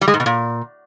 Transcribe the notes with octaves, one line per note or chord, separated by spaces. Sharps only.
G3
G#3
G#2
B2
A#2